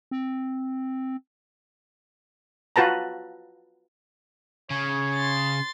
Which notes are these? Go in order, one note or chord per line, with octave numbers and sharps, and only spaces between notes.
C4
F4 F#4 B4 A5 A#5
C#3 C#5
C6 A6